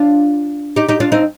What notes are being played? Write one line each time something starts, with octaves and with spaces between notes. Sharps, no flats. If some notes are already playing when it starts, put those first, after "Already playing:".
Already playing: D4 F4
D#4 G4
D#4 G4
D4 F4
C4 D#4